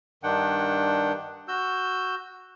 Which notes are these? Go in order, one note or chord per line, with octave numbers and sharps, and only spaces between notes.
G2 D#3 D4 F#5 G5
F#4 E6 G6